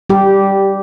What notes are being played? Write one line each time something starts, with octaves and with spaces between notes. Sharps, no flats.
G3 G4